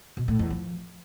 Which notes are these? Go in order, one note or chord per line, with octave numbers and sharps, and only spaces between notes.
B2
A2
E2
F3